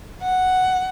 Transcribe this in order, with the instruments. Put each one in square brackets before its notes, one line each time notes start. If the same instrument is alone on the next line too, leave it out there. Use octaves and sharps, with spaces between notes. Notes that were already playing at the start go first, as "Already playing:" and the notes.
[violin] F#5